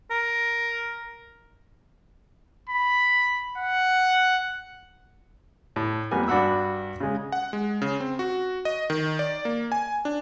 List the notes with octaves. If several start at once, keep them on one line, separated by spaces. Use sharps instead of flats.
A#4
B5
F#5
A2
F2 G3 A#3 B3 G#5
G2 D4 F#4 F#5 B5 E6
C#3 G#3
F#5
G#3
C#3
C4
F#4
D#5
D#3
D5
A#3
G#5
D4